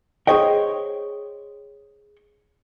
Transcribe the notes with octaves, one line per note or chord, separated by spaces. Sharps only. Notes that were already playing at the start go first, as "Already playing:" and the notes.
G#4 A#4 C5 C#5 D#5 G5